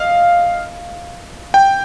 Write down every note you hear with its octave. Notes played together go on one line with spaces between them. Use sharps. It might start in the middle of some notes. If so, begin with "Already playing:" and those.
Already playing: D#5 F5
G5